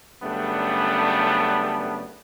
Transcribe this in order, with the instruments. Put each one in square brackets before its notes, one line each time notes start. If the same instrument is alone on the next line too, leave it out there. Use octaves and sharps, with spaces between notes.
[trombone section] F#2 C#3 G3 A3 B3 D4